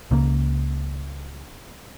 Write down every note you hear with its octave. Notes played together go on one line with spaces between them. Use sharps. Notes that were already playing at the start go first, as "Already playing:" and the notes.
C#2 C#3 A#3